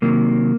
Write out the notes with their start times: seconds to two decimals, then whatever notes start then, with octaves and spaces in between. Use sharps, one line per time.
0.02 C3 D#3 F#3 A#3